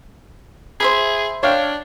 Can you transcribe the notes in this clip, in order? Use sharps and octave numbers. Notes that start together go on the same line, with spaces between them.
G#4 C5 E5 B5
D4 C#5 F5 G5